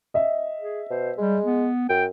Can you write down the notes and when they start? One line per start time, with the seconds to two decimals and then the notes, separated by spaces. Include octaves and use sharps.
0.14 D#5 E5
0.61 G#4
0.91 B2 C5
1.18 G3 G#3
1.45 B3
1.89 F#2 G5